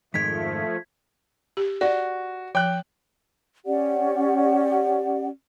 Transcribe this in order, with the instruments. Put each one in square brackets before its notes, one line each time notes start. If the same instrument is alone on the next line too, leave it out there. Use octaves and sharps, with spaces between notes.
[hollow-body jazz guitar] F2 G#2 D#3 [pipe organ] F3 A3 [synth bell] G#6 B6
[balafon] G4
[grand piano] F#4 [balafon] D5
[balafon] F3 [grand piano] G5 F#6
[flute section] C#4 G4 D5 F#5